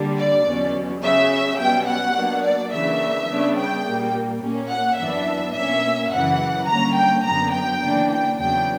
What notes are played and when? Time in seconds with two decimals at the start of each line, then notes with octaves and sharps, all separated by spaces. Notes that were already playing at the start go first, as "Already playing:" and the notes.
Already playing: D3 G3 A#3 D4
0.18 D5
0.47 E2 B2 F#3 C#4
1.02 C#3 F#3 C#4 E5
1.59 B2 G3 C#4 G5
1.88 F#5
2.16 B2 F#3 A#3 D4
2.44 D5
2.72 C#3 E3 A#3 D4 E5
3.29 C#3 G3 B3 D4
3.58 G5
3.86 A#2 G3 A#3
4.43 A#2 A#3 C#4
4.71 F#5
4.99 F#2 E3 B3 D4 E5
5.55 B2 A#3 C#4 E5
6.13 F#2 C#3 E3 F#5
6.69 D3 G3 A#3 C#4 A#5
6.97 G5
7.25 F#2 D3 F#3 B3 A#5
7.54 G5
7.83 C#3 E3 A#3 D4
8.11 G5
8.39 E2 C#3 F#3 B3 D4 G5